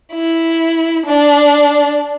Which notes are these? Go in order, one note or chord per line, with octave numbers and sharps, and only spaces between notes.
E4
D4